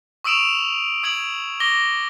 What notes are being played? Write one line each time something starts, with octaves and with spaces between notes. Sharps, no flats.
C#6 D#6 E6 D7 E7 F7
D#6 G#6 D7 F#7
D6 A#6 G7